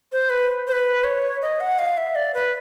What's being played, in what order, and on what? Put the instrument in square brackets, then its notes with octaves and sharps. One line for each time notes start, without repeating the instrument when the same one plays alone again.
[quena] C5
B4
C5
B4
C#5
D#5
F#5
F5
E5
D5
B4